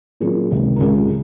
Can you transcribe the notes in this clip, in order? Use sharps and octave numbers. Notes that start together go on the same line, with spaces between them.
A#2 F#3 C#4 F4 G#4
C#2 C3 D#3
A#4
C#2 C#3 G#3 C#4 F4 G#4